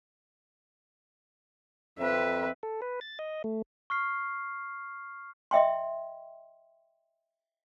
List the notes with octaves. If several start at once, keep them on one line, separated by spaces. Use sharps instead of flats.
F2 C4 B4 E5
A4
B4
A6
D#5
A3
C#6 F6 C7
D#5 E5 G5 C6